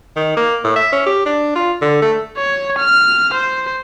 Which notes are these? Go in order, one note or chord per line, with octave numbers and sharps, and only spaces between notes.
D#3
A#3
A2
E5
C#4
G4
D4
F4
D3
A3
C#5
F6
C5